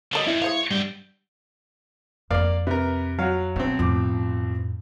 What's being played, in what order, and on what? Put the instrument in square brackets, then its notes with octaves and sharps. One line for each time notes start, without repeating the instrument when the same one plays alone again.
[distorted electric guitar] D3 G3 [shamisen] F#3 A4 D#5
[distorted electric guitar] G2 [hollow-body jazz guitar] E4
[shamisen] G#3 C5 F5 [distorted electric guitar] C#5
[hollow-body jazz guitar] G2 [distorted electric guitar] F#3 G5
[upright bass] F2 D4 [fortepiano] A#3 D5 F5
[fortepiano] C3 A#4 [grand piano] B4
[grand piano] F#3 [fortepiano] F#4 F5
[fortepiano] B1 C4 [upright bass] E4
[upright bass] F2 A2 [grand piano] F3 D6